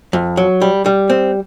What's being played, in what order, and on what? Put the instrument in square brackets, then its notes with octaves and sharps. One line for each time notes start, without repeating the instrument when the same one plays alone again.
[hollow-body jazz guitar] F2
F#3
G3
G3
C4